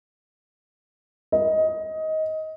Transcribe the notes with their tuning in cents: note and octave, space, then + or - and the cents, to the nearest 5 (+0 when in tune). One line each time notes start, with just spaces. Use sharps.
D#5 +15